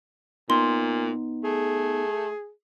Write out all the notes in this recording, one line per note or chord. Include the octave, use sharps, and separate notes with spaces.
A#2 B3 D#4 C6
A3 G#4